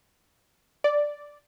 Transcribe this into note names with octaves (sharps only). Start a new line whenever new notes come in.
D5